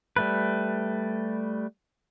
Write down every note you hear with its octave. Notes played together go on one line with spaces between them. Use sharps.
G3 A3 B4